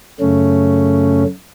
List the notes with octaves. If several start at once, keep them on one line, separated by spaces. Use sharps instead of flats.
F#2 C#3 A3 C#4